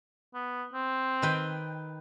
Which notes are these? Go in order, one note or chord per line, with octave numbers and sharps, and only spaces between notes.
B3
C4
D#3 B4 G5